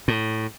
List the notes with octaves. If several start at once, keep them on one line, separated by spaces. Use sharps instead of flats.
A2